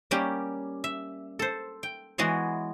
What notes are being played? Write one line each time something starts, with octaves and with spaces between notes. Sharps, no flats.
G3 A#3 C#4 G4
E5
A4 C5
G5
E3 G#3 B3 F#4 G#4 C#5